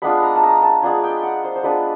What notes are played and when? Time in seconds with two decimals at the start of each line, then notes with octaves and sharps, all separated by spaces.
0.02 G#3 B3 D4 F4 B5
0.23 A#5
0.36 A5
0.43 A#5
0.63 A5
0.82 G#3 B3 D4 F4 G#5
1.04 G5
1.23 F#5
1.44 C5
1.56 C5
1.63 G#3 B3 D4 F4 B4